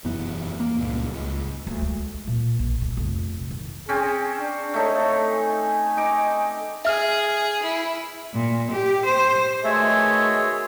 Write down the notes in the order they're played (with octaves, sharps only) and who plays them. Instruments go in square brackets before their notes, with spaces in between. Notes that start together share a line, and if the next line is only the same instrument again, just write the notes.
[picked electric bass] E1 F#2 E3 B3
A#3
C#2 G2 A#2
C#2
[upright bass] D2
G#3
A#2
A#1
D3
F1
D#3
[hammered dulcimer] C4 C#4 [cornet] G#4
[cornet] D4
[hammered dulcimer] A3 D#4 [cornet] C#5
[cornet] G#5
[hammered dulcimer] D#4 D6
[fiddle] G#4 [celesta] E5 F6
[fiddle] E4
[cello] A#2
G4
C5
[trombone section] B2 D#3 G#3 [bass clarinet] A3 [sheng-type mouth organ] C#5 E5